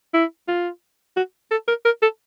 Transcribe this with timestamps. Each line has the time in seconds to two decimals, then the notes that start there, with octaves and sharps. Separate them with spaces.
0.14 E4
0.48 F4
1.17 F#4
1.51 A4
1.68 A#4
1.85 A#4
2.02 A4